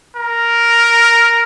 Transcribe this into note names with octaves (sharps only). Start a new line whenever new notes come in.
A#4